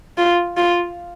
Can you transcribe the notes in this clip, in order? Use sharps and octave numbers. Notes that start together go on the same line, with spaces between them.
F4
F4